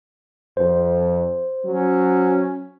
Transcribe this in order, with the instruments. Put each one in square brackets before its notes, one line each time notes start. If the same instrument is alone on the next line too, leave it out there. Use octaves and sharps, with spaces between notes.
[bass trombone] F2 [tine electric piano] C5
[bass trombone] F#3 [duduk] C#4